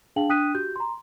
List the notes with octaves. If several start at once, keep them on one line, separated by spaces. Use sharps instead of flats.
D4 G#4 F5 G5 A5 F#7
D4 G5 D#6 F#6 B6 D#7
F#4 G4 G6
A#5 C6